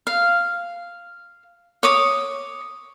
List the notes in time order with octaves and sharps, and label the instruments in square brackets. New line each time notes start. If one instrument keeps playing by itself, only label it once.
[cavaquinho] F5
C#5 D6 D#6